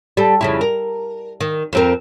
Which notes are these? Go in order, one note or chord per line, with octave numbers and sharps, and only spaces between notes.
G3 A4
F2 C#3 E4
A#4
D#3
F2 C4 A#4